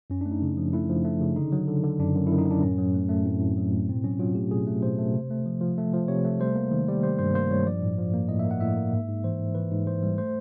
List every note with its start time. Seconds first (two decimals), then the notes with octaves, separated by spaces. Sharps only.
0.10 F#2 C#4
0.21 A3 D4
0.32 D#4
0.42 C#3
0.57 F3
0.73 A3 E4
0.89 F3
1.05 A3
1.21 C#3
1.36 D3 D#4
1.52 F#3
1.68 D3
1.84 D3
1.99 F#2 D4
2.15 F#2
2.27 F#2 E4
2.38 D#4
2.46 F#2 D4
2.63 A2 C#4
2.78 F#3
2.94 A3
3.09 A3
3.25 A2 C4
3.40 A2
3.57 F#3
3.73 A2
3.89 B2 C4
4.04 F#3 C#4
4.19 F#3 F4
4.35 A3 G4
4.51 B2 G#4
4.67 A3
4.82 B2 C5
4.98 A3
5.14 C3
5.31 A3
5.46 F3
5.61 F3
5.78 A3
5.93 F3
6.08 C3 C#5
6.25 A3
6.40 G3 C5
6.56 A#3
6.71 D#3
6.88 G3
7.03 G3 C5
7.19 G2 C5
7.34 A#3 C5
7.51 G2 C#5
7.66 F3 D5
7.82 A2
7.98 F3
8.14 A#3
8.29 A2 D#5
8.39 E5
8.45 A#3
8.51 F#5
8.61 A2 E5
8.77 A#3
8.93 G#2
9.08 G#2
9.24 E3 C5
9.39 G#2
9.55 E3 B4
9.71 G#2
9.87 E3 C5
10.03 G3
10.18 A3 C5